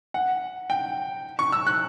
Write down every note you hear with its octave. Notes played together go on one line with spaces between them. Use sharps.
F#5
G5
C#6
E6
F#6